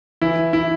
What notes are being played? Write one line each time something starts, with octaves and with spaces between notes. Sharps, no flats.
E3 E4
E4